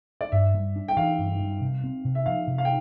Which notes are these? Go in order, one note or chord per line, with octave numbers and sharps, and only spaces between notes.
D5
G2 E5
G3
D4
G5
E3 F5
G2
G3
C3
C4
C3
E5
F3 F5
C3
F5
G5